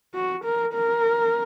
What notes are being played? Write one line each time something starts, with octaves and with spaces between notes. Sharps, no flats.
F#4
A#4
A#4